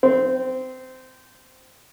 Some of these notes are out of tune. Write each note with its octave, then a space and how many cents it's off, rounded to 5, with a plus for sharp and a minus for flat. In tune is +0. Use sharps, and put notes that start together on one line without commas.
C4 -20